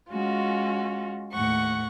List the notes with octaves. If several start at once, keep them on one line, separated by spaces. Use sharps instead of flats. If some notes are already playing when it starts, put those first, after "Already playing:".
G#3 C#4 F4 F#4
D#2 A2 F#5 C#6